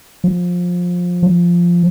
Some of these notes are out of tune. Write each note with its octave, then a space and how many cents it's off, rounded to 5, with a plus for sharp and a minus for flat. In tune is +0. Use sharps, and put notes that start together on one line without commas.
F3 +20
F3 -5